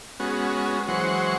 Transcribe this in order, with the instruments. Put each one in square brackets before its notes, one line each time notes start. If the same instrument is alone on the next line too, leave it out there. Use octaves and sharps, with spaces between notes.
[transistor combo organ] G#3 B3 C#4 F#4
E3 F#3 G#3 C5 F#5 C#6